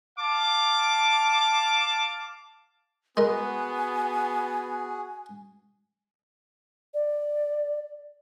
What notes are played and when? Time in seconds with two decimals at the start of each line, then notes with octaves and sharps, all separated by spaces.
0.18 F5 A5 D6
3.17 G#3 B3 F#4 G#4 A#4 G#5
6.94 D5